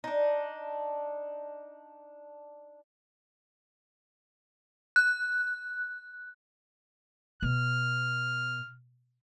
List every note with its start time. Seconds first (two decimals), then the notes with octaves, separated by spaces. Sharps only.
0.04 D4 D#4
4.96 F#6
7.42 B2 F6